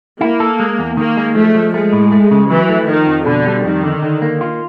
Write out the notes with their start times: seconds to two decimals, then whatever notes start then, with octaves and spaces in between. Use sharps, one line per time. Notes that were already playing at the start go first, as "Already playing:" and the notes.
0.21 A#3 E4
0.40 A4
0.60 G#3
0.79 E2
0.97 D#3 A#3
1.17 G#3
1.35 F3 A3
1.55 F3
1.74 G#3 A3
1.93 A2
2.12 A3
2.31 C#3
2.50 E3 F#3
2.69 A3
2.88 D#3 F3
3.07 F2
3.26 B2 D3
3.46 G3
3.64 F2 D#3
3.84 D3
4.03 D3
4.22 A#3
4.41 F4